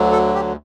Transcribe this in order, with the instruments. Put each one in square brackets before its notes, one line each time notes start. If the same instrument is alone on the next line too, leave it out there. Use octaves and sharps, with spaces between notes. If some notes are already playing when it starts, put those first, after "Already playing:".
Already playing: [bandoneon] D2 D3 F#3
A4
G4